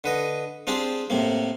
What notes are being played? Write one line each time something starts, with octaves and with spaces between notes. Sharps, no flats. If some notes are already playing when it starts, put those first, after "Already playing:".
D3 B4 D#5
C4 D4 F4 G4 G#4
A2 C3 A#3